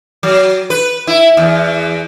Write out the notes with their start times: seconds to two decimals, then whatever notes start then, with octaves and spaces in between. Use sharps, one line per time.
0.23 F#3
0.70 B4
1.07 E4
1.37 E2